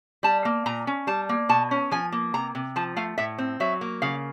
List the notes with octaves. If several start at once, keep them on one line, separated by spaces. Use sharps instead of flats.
G3 A5
A#3
A#2 A#5
C#4
G3 A5
A#3
B2 A5
C#4
F3 G#5
A#3
C3 A#5
C3
F3 A5
A3 F5
A2 E5
C4
F#3 E5
A#3
C#3 F5